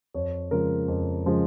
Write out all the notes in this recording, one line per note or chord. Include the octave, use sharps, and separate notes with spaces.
F2 C#5
C#3 F3 G#3 A#4
F2
C#3 F3 G#3